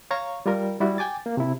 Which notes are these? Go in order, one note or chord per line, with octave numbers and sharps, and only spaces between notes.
C#5 F5 A#5 C#6
G3 F4 A#4
G3 E4 F#4
G5 G#5 D6 A6
A#3
C3 E4